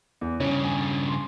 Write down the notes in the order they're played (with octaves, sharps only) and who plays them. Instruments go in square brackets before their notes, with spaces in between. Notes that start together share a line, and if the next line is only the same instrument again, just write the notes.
[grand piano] E2
[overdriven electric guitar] G2 C#3 [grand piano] C#4
[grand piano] G#5
C6